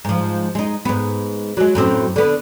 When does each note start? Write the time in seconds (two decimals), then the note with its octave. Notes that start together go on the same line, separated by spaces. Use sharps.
0.05 G#2 F3
0.55 G#3 D#4
0.85 G#2 B3
1.57 F#3 G#3
1.75 F#2 A2 C4
2.16 D3 B3